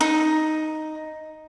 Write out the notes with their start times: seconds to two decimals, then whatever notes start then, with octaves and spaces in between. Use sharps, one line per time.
0.01 D#4